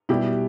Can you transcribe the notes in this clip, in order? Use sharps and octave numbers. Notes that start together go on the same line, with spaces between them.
B2 G3 E4 G4